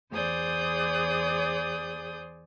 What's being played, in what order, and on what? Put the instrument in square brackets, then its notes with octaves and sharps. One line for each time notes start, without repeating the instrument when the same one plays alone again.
[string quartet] E2 G#4 C5 D5 D#6 G6